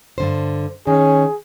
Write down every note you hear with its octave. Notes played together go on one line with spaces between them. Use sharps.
G2 D3 C5
D#3 C#4 G#4